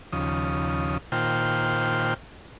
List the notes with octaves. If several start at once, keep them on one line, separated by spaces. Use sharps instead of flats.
D#2 C#3 F3 D#6
A#2 D#3 F4 C5 G5 F6